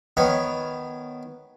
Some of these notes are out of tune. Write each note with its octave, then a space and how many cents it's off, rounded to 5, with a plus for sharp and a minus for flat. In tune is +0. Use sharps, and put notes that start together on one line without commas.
D#3 +0 B3 +0 C#5 +0